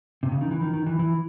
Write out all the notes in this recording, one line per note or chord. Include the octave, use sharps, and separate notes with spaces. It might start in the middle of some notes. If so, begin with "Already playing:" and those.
C3
C#3
D#3
E3
D#3
D#3
E3
E3